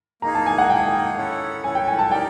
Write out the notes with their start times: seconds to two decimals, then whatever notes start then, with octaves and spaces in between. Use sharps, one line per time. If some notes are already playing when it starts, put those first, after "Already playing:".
0.22 A#3 A#5
0.25 D#4 G#4
0.35 A5
0.46 G#5
0.58 F#5
0.70 A#3 D#4 G#4 G5
1.17 C#4 E4 A4 C#5 F#5
1.63 C#4 E4 A4 C#5 F#5 G#5
1.75 G5
1.88 G#5
1.99 A5
2.10 D#4 G4 A#4 D5 G5